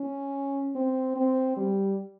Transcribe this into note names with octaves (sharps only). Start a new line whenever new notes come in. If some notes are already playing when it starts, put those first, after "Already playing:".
Already playing: C#4
C4
C4
G3